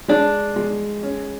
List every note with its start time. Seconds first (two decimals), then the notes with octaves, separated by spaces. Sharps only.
0.08 G#3 D4
0.56 G#3
1.03 C#4